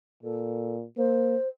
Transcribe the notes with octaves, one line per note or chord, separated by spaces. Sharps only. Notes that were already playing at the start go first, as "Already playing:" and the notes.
A#2 A4
A#3 C5